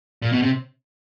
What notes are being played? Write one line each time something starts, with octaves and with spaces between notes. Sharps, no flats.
A#2
B2
C3